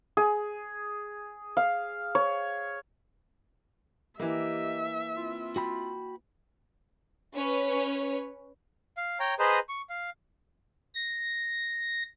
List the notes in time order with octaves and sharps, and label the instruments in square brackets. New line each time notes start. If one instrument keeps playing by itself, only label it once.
[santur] G#4
F5
C#5
[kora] E3 A#3 [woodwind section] G4 D#5 [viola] E5
[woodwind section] C4 E4 F4
[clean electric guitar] F#4 G5 B5
[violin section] C#4 B4 C#5
[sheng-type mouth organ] F5
C#5 G5 A#5
G#4 B4 C5 D#5 A#5
C#6
F5
[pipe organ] A#6